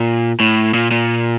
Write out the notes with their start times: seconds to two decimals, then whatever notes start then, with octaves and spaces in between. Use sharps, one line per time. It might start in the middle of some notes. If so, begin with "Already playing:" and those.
Already playing: A#2
0.40 A2
0.74 A#2
0.91 A#2